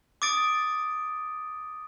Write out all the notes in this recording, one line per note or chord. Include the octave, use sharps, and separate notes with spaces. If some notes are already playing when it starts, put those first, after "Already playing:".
D6 D#6 A6 D7